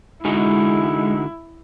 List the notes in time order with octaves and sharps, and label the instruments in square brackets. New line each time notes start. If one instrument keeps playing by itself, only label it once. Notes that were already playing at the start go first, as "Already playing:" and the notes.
[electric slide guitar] D3 D#4 F#4 [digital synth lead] G#3 [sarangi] E4